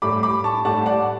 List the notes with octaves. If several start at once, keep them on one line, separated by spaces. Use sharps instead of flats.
A2 G3 B5 D6
B5 D6
A5 C#6
A2 G3 F#5 A5
D5 F#5